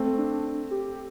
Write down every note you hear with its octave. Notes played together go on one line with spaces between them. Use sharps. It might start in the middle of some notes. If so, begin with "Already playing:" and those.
Already playing: A3 C4
D4
G4